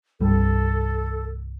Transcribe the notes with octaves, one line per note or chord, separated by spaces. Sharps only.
C2 G2 G3 A4